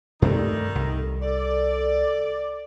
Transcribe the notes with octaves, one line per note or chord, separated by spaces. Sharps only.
G2 C3 D#3 G3 A3 D#4 A4
C2
A4 D5